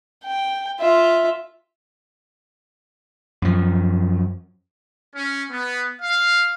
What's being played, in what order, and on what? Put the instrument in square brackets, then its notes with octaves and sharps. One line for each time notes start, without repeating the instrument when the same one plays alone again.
[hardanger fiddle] G5
F4 E5
[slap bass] F#2 F3
[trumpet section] C#4
B3
F5